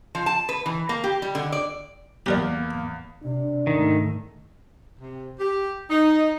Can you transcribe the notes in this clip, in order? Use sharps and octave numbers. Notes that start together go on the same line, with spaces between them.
F3
A5
B4
E3
A#3
G4
G3
D3
D5
E2 A#3 G4 A#4 D5
C3 D4
G#2 D#3 A3
C3
G4
D#4